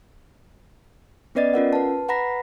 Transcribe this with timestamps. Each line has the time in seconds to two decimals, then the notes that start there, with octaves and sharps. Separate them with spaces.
1.35 B3 C#4 B4 D5 D#5 A6
1.54 C#4 F4 A#4 F#5
1.73 B4 A5
2.08 B4 F#5 A#5 B5 A#6 B6